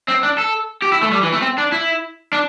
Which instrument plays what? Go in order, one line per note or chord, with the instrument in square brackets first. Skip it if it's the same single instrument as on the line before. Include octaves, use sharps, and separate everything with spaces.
[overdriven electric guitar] C4
D4
A4
G4
E4
A3
G3
E3
A3
C4
D4
E4
D4